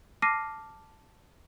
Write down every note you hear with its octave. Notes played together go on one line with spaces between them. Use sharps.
A5 D6 F6 A#6 C7 D#7